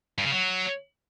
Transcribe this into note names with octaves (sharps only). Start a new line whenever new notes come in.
G2
C#3
F#3